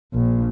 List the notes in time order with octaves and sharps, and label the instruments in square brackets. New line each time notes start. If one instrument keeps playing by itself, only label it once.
[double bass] A#1